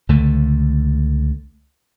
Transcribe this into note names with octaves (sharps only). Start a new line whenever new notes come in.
C#2 D3 A3